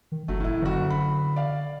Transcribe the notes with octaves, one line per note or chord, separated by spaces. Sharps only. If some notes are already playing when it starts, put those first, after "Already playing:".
D#3
F#1 F#3 A3
A2 E4
F#1 D3 F#4
B5
D5 F5